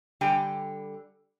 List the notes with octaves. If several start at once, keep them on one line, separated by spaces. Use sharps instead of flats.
D3 G3 G4 G5 G#5